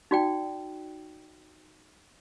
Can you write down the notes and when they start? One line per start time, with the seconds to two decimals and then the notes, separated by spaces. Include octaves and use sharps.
0.11 D#4 F#4 D5 G5